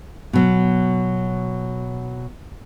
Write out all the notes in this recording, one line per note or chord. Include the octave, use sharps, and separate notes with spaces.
B2 F#3